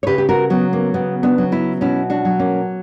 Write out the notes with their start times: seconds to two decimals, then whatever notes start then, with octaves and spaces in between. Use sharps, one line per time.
0.03 C#5
0.07 C#3 G4 B4
0.18 G4
0.29 F#4 A#4
0.50 F#3 B3
0.73 A#3
0.94 C#3 B3
1.23 B3 D4
1.38 F#3
1.52 C#4 E4
1.81 B2 C#4 E4
2.10 D4 F#4
2.25 F#3
2.39 A#3 C#4